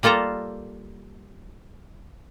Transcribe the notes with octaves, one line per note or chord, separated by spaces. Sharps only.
G3 A#3 F4 A4 A#5